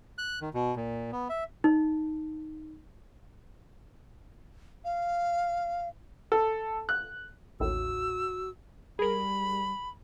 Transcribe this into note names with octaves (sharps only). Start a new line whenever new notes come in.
F#6
D#3
B2
A#2
B3
E5
D#4
F5
A4
F#6
A1 D#2 A2 F#4 E6
G3 G#4 A#4 B5